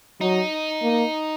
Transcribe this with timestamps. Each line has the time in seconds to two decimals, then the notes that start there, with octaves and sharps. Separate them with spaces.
0.21 F#3 D#4
0.83 A#3